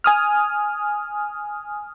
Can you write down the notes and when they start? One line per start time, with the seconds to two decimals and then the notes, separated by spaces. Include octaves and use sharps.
0.04 G#5 D#6 F6